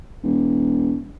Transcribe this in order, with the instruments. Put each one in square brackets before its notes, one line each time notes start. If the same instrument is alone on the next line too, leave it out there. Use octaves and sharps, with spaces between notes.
[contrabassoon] E1